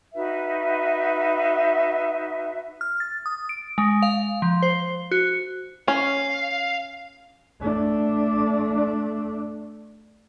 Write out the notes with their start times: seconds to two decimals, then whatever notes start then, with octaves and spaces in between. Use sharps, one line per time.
0.14 D#4 F#4 B4 E5
2.81 F6
3.00 A6
3.26 D#6
3.49 D7
3.78 G#3
4.02 F5
4.42 F3
4.62 C5
5.11 F#4
5.88 C#4 F5
7.60 A3 D4